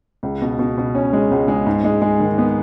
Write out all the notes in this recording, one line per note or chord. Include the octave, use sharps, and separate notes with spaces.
C#2
B2
B2
B2
C#4
G#3
C#2
G#3
G#2
G#3
G#3
D#3
B3